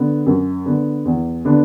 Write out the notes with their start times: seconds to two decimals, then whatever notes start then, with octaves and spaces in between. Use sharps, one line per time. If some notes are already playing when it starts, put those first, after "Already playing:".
Already playing: D3 B3
0.26 F#2
0.66 D3 B3
1.05 E2
1.45 D3 B3 D4